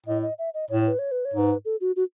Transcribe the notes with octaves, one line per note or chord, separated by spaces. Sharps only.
A2 D#5
D#5
E5
D#5
A2 C#5
B4
C#5
B4
C#5
G#2 B4
A4
F#4
F#4